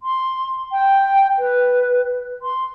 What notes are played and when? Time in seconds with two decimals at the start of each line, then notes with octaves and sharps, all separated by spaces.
0.03 C6
0.72 G5
1.39 B4
2.42 C6